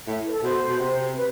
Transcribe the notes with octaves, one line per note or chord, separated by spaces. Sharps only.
A2 E5
B4
A4
B2 C5
B2
C3
B4